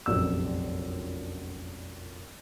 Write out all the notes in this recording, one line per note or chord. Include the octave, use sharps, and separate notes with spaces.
F1 A#1 F#2 E6